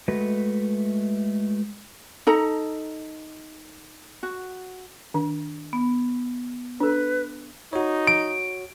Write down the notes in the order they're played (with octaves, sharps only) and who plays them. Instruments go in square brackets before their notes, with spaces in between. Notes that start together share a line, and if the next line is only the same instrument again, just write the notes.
[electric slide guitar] G#3 A3 F#4 B4
[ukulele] D#4 A4 A#5
F#4
[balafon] D#3 D4
[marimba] B3
[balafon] D4 A4 [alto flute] B4
[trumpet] D#4 [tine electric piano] F#4 C#5
[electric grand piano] D7